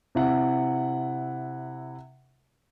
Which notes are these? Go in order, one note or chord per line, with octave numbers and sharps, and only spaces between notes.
C3 E4 F#5